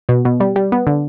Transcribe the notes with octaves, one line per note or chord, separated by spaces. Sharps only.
B2
B2
G3
G3
B3
D3